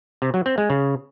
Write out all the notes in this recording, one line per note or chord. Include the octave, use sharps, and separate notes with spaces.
C3
F#3
C4
G#3
C#3